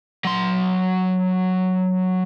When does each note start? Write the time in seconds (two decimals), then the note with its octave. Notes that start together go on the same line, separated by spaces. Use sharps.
0.25 F#3 C6